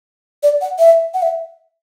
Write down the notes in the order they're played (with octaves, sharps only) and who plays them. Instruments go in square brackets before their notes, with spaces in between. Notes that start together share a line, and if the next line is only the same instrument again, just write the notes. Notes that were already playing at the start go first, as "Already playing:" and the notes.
[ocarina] D5
F#5
E5
F#5
E5